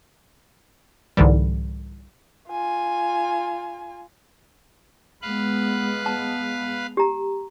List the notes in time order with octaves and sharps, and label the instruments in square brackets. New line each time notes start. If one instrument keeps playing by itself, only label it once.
[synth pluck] C2 G#2 D3 E3 G3
[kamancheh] F4 G#5
[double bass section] G#3 B3 [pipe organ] B4 F5 F#6
[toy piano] A5
G4 A#5